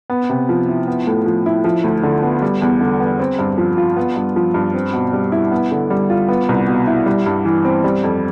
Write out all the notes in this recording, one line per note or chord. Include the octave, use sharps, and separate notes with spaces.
B3
C3
F3
E4
B3
A2
F3
E4
F3
D2
D3
B3
G3
E2
D3
B3
C4
G2
F3
F4
B3
G2
F3
G2
C4
B2
G3
E4
B3
D3
G3
F4
B3
C2
B2
E4
G3
G2
E3
C4
G3
F2